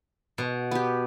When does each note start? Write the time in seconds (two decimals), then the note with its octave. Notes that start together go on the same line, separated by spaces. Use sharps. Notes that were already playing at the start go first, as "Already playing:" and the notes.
0.38 B2
0.71 B3 G4